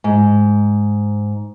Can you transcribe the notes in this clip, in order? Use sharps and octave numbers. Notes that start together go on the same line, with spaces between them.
G#2